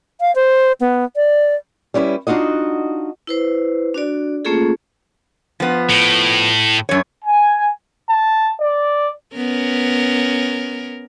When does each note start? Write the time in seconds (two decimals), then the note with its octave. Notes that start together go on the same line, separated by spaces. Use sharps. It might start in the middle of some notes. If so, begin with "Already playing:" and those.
0.21 F5
0.36 C5
0.81 B3
1.16 D5
1.94 G3 C#4 E4 B4
2.27 D4 D#4 F4 F#4 D#5
3.27 E4 B4 C5
3.94 D4 F#4 D5
4.45 A3 A#3 C#4 F4 G#4 A4
5.60 F3 B3
5.90 A2
6.89 F#2 C#5
7.25 G#5
8.09 A5
8.61 D5
9.36 B3 C#4 A#4